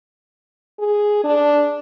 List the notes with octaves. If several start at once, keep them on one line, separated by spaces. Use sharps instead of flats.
G#4
D4